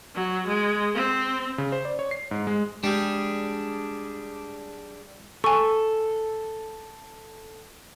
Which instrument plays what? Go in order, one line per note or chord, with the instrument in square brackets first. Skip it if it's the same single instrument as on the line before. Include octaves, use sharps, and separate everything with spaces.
[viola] F#3
G#3
C4
[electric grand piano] C#3
C5
D5
C#5
C7
G#2
G#3
[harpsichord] G3 [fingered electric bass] G#3 [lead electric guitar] D4 G#4
[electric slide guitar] A4 [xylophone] G#5 C#6